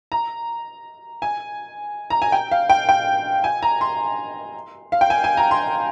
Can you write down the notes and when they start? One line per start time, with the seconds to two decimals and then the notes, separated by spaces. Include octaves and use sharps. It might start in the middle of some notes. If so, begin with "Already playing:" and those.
0.12 A#5
1.22 G#5
2.10 A#5
2.22 G#5
2.32 G5
2.51 F5
2.70 G5
2.89 G5
3.44 G#5
3.63 A#5
3.81 C6
4.92 F5
5.01 G5
5.10 G#5
5.24 G#5
5.37 A#5
5.51 C6